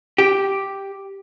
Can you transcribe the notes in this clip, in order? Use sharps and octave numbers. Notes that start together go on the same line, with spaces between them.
G4